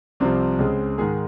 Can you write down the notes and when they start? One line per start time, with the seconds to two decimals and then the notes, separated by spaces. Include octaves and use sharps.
0.20 C2 C3 F3 C4
0.58 C#2 C#3 G#3
0.98 G#2 D#3 G#3 G#4